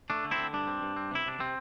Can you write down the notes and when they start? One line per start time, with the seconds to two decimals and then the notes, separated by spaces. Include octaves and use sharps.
0.10 A3 D4
0.24 D3
0.31 C4 E4
0.38 D3
0.53 G2 D4
0.67 C4
0.82 G2
0.96 C4
1.11 C3 E4
1.26 C3 D4
1.40 C3 C4